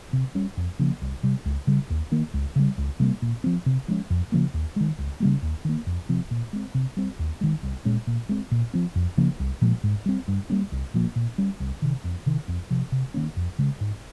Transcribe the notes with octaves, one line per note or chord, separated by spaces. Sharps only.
C3
G3 C#4
F2
C#3 F3 A#3
C2
C3 G3
C#2
C#3 G3
D#2
D#3 A#3
C#2
C#3 G3
C#2
C3 G3 A#3
A#2
F3 C4
C3
F3 G#3 C#4
F2
C#3 F3 A#3
D#2
D#3 G#3
C#2
C#3 G3 A#3
D#2
D#3 A#3
F2
C3 F3 C4
A#2
G#3 C4
C3
G3 C4
D#2
D#3 G#3
C2
A#2 G#3 C#4
A#2
G#3 C4
A#2
F3 C4
F2
C#3 F3 A#3
C2
A#2 F3 G#3
G#2
G3 C4
G2
G3 A#3 C#4
C2
A#2 F3 A#3
A#2
G3 C#4
C2
C3 D#3
F2
C3 D#3
F2
C3 F3
C3
D#3 A#3 C#4
F2
C#3 G#3
G#2